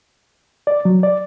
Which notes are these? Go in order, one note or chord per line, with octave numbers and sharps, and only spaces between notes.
D5
F#3
D5